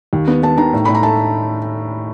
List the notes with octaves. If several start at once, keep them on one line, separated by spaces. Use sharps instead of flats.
D#2
B3
B3 A5
D#3 A#5
A2
A2 B5
A#5
A3 A5